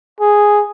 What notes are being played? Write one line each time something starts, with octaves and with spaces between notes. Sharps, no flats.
G#4